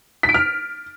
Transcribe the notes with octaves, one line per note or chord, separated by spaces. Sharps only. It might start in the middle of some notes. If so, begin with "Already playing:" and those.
B6
D7
F6